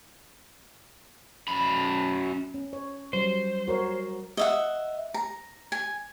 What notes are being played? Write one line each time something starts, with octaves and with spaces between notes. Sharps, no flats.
F#2 B5
C#4
C#5
F#3 G3 C5
F#4 A#4 C#5
D#5 E5 F#5
A#5
G#5